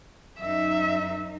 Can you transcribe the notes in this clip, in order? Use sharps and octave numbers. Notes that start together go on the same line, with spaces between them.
F#2 D#4 E5